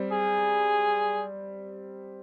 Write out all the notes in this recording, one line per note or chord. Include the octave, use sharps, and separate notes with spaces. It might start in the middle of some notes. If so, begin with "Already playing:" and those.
Already playing: G3 C4
G#4